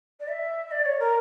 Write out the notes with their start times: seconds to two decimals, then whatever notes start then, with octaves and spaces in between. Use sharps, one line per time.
0.20 D5
0.28 E5
0.71 D5
0.85 C#5
0.99 A#4